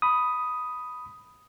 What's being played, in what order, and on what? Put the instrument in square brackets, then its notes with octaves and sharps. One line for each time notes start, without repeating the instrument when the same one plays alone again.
[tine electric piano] B5 D#6